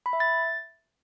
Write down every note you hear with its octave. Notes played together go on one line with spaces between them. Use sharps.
B5
E5
A6